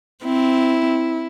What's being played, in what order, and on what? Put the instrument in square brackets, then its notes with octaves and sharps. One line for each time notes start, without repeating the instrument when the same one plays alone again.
[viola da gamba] C4 [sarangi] E4